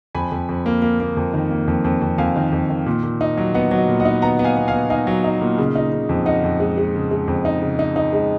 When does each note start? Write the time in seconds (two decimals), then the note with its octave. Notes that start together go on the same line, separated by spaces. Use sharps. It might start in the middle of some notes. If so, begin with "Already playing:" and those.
0.15 F2 G#5 B5
0.32 F2
0.49 F2
0.66 A#3
0.82 A#3
1.00 A#3
1.17 F2
1.34 D#3
1.50 A#3
1.68 F2
1.84 F2
2.01 F2
2.18 F2 F5 G#5
2.36 D#3
2.52 F2
2.69 D#3
2.86 A#2
3.03 A#2
3.21 D#4
3.37 F#3
3.54 B3 D#5 F#5
3.71 F#3
3.77 D#5
3.88 A#2
4.00 D#5 F#5
4.05 D#4
4.22 B3 F#5 A#5
4.39 B3
4.44 F5 G#5
4.56 B3
4.68 F5 G#5
4.73 B3
4.90 D#4 F5 G#5
5.07 F#3
5.24 D#4
5.41 A#2
5.58 C#3
5.76 D#4
5.92 C#3
6.09 F2
6.26 D#4 D#5 F#5
6.44 F2
6.60 G#3
6.77 G#3
6.94 C#3
7.11 G#3
7.28 F2
7.45 D#4
7.62 C#3
7.79 D#4
7.96 D#4
8.13 G#3